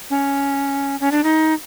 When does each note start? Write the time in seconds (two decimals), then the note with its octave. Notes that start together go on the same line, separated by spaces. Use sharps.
0.10 C#4
1.00 C#4
1.11 D4
1.24 D#4